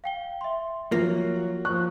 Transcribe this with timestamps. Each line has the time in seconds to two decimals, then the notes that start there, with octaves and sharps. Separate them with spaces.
0.04 F5 G5 G7
0.41 E5 C6
0.92 F3 F#3 A#3
1.65 F3 C#6 F#6